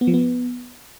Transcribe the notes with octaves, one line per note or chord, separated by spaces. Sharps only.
B3
F3
B3